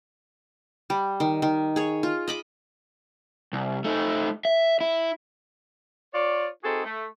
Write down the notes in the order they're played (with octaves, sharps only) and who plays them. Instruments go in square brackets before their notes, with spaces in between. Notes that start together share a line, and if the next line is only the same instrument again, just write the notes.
[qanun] G3
D#3
D#3
G#4 C#5
F4
D#5 B5 D6
[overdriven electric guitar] C2
A3 D#4
E5
E4
[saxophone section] F4 C#5 D5
C4 D#4 F#4 G#4 A4
A3